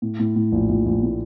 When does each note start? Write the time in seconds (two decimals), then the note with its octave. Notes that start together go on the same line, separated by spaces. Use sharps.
0.02 A2
0.19 A2
0.36 A2
0.52 A#1
0.69 A#1
0.86 A#1
1.03 A2